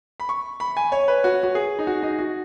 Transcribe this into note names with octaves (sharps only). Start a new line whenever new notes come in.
B5
C#6
B5
G#5
C#5
B4
F#4
F#4
G#4
D#4
F#4
D#4
F#4